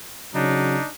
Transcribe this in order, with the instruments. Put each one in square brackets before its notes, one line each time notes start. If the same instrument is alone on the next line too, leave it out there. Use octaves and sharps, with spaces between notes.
[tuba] C#3 [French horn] F#3 [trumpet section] D4 D#4